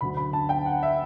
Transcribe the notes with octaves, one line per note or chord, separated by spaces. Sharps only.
D2 D3 F#3 B5
B5
A5
G5
F#5
E5